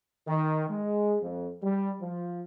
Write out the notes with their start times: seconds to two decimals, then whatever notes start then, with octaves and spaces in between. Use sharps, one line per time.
0.27 D#3
0.69 G#3
1.22 F2
1.63 G3
2.02 F3